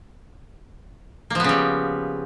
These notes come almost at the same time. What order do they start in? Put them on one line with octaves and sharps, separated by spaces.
A#3 F3 B3 C#3 G3